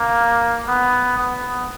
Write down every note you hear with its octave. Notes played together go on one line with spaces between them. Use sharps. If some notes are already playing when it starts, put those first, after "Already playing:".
Already playing: A#3
B3
B3